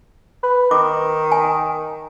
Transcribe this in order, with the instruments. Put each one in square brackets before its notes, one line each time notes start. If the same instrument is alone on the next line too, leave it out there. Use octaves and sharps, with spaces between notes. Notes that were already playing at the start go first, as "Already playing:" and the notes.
[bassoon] B4
[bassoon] D#3 [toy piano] D6
[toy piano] G#5